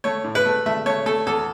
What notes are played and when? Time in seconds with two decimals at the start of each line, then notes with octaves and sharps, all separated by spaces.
0.04 A3 C#5
0.24 A2
0.35 B4
0.45 A3
0.66 A3 E5
0.86 A3 C#5
1.06 A3 A4
1.26 E2 A4